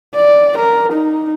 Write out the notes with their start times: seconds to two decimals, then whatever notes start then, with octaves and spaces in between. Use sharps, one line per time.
0.15 D5
0.58 A#4
0.92 D#4